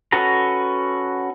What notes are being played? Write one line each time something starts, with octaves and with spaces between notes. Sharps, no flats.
C#4 F#4 A4 B4 A#5